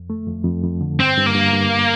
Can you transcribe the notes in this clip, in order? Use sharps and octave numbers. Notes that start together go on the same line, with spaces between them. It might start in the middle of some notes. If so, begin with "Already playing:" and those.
Already playing: F2
A3
F2
F2
F2
D3
G2 C4
G2
A#3
G2
G2